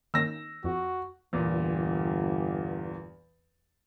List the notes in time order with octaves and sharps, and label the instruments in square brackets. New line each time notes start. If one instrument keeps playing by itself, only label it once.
[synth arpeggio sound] D#3 A#3 C#4 [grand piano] E6 A#6
[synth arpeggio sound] F2 [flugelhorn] F#4
[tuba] G1 [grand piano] E2 A#2